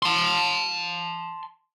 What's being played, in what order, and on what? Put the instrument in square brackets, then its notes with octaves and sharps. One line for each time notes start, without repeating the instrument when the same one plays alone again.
[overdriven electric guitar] A5 C6